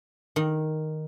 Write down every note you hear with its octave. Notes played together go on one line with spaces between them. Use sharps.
D#3